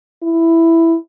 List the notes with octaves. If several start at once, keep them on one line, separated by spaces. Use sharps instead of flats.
E4